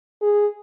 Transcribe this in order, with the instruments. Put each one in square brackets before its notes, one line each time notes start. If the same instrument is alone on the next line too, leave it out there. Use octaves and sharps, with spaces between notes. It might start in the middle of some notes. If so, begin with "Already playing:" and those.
[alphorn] G#4